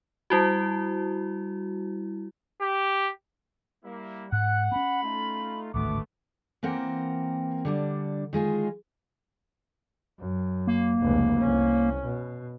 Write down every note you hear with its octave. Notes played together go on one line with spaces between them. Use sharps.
G3 E4 F#4
G4
G3 A#3 E4
G#2 F#5 F#6
C4 C#4 B5
A3 D#4 F4
D1 G#1 D2 A3 B3 D6
E3 A#3 C4 A#4 F#5 G5
D3 G3 D4
D#3 G#3 F4 G#4
F#2
A#3
F1 C#2
C2 C#4
B2